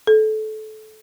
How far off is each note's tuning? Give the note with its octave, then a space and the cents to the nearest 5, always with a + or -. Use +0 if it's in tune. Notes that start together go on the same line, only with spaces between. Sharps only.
A4 -25